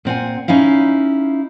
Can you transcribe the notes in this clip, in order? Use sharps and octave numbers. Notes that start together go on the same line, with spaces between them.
A#2 C4 F#5 G#5
C#4 D#4 E4 F5